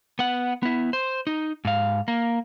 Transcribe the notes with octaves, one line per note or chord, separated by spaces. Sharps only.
B3 F#5
B3 E4
C5
D#4
G#2 F5
A#3